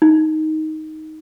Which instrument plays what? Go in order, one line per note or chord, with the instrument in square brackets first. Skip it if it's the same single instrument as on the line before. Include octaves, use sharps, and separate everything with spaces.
[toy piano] D#4